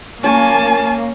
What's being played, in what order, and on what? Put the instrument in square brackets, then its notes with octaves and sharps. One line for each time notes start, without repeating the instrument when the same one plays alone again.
[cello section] A#3 [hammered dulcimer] C#4 C#6 [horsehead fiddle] G#5 A5